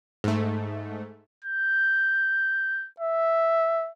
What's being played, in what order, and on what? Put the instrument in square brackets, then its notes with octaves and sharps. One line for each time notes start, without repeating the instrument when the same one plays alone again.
[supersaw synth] G#2 A3
[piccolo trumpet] G6
E5